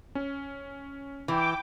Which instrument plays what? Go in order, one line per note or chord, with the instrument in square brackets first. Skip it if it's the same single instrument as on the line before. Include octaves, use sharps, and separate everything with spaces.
[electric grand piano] C#4
[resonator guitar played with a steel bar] E3 [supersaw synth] G5 D6